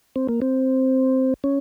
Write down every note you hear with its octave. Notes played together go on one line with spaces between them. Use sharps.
C4
A#3
C4
C#4